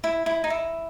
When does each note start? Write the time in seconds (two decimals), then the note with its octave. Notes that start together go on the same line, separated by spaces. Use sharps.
0.04 E4
0.26 E4
0.44 D#4
0.50 E4